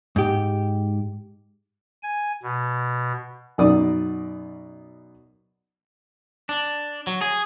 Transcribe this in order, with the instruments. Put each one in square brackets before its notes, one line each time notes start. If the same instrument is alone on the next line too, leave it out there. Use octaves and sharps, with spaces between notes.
[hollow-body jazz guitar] G#2 G4
[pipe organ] G#5
B2
[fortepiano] F#2 B2 D#4 D5 D#6
[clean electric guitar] D4
F#3
G#4